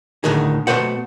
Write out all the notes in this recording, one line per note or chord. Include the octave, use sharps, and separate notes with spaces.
D2 A2 D3 D#3 G#4
B2 A3 B4 C5 F#5